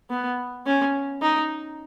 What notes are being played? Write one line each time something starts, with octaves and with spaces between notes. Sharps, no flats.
B3
C#4
D#4